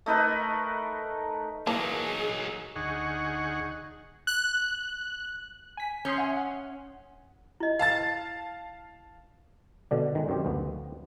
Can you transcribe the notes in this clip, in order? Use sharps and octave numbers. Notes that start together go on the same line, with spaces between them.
A3 D#4 A#4 B4
E3 F#3 A#3 D#4 G#4 A5
D2 D#4 G#4 F#5 C#6
F#6
G#5 B6
C#4 C6 D#6 G6
E5 F#5 G#5
F#5
E4 D#5
F5 A5 A6
B2 D3 D4
D#3 G#3
F#2 C4 G4
D2 F3 B3